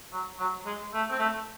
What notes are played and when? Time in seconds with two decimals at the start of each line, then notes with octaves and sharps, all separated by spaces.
0.13 F#3
0.39 F#3
0.66 G#3
0.94 A3
1.10 C4
1.19 A3